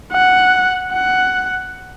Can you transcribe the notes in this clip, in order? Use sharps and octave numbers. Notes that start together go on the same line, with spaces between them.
F#5
F#5